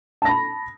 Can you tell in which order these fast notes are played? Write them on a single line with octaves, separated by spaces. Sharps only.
A5 A#6 B5